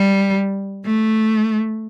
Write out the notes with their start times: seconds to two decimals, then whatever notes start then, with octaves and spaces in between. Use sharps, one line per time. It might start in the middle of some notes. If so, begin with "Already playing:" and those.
Already playing: G3
0.85 A3